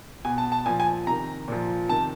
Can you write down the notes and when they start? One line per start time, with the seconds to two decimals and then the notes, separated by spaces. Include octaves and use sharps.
0.25 B2 G#5
0.38 A5
0.52 A5
0.66 A#2 F3 G#5
0.80 G#5
1.07 C3 D#3 A#5
1.48 A#2 F3
1.89 C3 D#3 A5